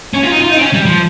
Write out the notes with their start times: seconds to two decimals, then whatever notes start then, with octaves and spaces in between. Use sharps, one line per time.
0.14 C#4
0.24 F4
0.32 D#4
0.41 F4
0.50 D#4
0.57 C4
0.61 C#4
0.73 G3
0.85 F3